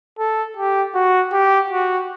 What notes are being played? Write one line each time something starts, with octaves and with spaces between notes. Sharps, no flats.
A4
G4
F#4
G4
F#4